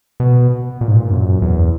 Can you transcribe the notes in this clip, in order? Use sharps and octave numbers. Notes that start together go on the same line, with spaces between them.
B2
A#2
G#2
A#2
F#2
E2